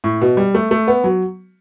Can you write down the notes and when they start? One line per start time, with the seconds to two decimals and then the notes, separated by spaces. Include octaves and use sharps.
0.04 A2
0.21 B2
0.37 G3
0.55 A3
0.71 A3
0.88 B3
1.04 F#3